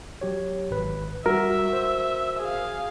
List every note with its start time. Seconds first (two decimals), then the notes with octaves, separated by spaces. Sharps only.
0.21 F#3 G4 C#5
0.71 G#1 B4
1.26 G3 F#4 A#4 E5
1.73 C5
2.39 G#4 F5